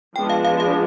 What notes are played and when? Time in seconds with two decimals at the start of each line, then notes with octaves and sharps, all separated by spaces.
0.16 F3 G#3 B3 D4 G5
0.30 F5
0.45 F5
0.60 F5